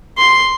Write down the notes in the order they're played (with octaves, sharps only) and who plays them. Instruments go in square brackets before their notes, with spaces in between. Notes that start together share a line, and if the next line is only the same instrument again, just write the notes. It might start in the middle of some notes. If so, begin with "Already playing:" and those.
[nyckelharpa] C6